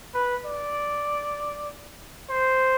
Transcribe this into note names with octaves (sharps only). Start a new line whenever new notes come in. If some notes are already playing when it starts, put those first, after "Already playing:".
B4
D5
C5